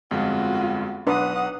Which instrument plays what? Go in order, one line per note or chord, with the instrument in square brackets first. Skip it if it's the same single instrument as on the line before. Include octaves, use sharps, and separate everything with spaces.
[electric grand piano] G1 F2 G#3 [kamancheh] F4 F#4
[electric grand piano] B1 A#5 C6 [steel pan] D4 B4 [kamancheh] F#5 D#6